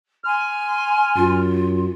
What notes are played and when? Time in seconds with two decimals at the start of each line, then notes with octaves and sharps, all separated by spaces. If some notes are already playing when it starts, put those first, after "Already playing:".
0.24 G#5 C6 F6
1.16 F#2 F4